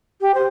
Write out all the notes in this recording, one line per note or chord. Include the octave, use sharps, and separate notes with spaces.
G4
C5